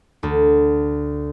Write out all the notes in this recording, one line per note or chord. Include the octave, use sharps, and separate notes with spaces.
D2